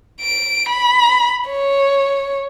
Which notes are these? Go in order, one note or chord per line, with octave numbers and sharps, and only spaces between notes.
D7
B5
C#5